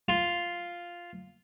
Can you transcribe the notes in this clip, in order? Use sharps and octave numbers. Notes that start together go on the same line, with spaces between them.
F4